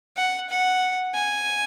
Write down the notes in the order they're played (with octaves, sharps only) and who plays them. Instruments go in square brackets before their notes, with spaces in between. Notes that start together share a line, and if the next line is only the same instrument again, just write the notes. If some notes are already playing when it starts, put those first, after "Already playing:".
[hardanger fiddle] F#5
F#5
G#5